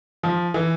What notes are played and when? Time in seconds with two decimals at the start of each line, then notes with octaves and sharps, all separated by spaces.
0.23 F3
0.54 E3